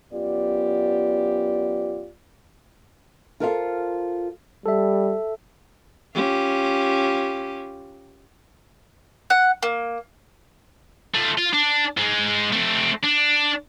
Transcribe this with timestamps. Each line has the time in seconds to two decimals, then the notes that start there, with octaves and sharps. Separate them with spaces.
0.13 F#2 B3 F4 G4 D5
3.40 F4 A4 A#4 C5 D#5 F5
4.66 G3 A4 E5
6.14 C#4 F4 G4
9.30 F#5
9.63 A#3
11.14 A3 F4
11.38 F4
11.53 D4
11.97 G#2 G#3
12.52 A3 C4
13.04 D4